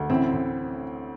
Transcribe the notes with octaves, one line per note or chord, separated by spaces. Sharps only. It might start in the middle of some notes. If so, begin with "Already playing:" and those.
Already playing: D2
A1 C4 E4
A1